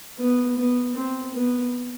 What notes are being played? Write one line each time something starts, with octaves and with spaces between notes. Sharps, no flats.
B3
B3
C4
B3